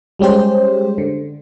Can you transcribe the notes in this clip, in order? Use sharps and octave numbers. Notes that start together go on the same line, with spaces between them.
G3 G#3 C#4 G4 C5
D3